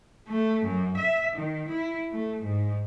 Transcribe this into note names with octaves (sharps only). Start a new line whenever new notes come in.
A3
F#2
E5
D#3
E4
A3
G#2